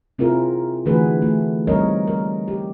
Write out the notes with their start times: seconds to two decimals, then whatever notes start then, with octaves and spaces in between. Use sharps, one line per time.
0.18 C3 C4 E4 F4 G#4 A#4
0.86 D3 E3 A3 F#4 G#4 B4
1.22 A3
1.67 G3 C4 D#4 A#4 C#5 D#5
2.07 A#4
2.48 G4